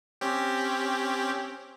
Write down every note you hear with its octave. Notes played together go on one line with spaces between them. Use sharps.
C4 C#4 G4